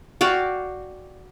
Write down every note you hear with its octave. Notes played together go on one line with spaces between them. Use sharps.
F#4 D5 F5 G5